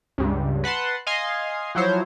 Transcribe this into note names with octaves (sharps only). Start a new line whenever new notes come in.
C#2 G2
B4 F#5 A5 C6
D#5 F5 G#5 C6
F3 F#3 E4 C5 C#5